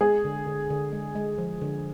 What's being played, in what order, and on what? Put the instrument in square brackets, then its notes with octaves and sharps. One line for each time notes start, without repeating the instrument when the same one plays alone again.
[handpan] G#3 [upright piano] G#4
[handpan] D3
D3
D3
G#3
G#3
F3
D3